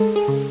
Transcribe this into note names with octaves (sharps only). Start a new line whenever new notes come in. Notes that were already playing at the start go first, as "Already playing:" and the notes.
Already playing: G#3 A4
G#4
C#3